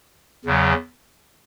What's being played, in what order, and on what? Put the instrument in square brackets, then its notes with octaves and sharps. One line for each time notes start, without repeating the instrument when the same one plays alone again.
[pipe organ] E2 C#3 F#3